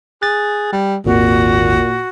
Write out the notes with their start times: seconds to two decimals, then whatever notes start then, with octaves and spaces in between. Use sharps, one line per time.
0.22 G#4 F#6 A6
0.72 G3
1.06 G#1 D#2 A#2 F#4